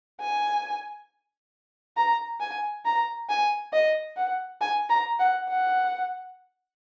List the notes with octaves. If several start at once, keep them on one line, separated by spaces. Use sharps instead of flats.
G#5
A#5
G#5
A#5
G#5
D#5
F#5
G#5
A#5
F#5
F#5